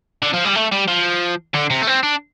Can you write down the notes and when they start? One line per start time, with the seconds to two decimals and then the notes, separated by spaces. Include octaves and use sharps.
0.23 D3
0.34 F3
0.45 G3
0.55 A3
0.72 G3
0.88 F3
1.54 D3
1.70 C3
1.82 A3
1.87 C4
2.03 D4